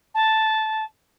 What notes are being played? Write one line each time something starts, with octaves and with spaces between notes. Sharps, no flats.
A5